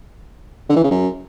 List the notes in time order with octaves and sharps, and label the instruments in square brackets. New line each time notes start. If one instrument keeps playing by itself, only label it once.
[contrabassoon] D3
E3
C#3
F#2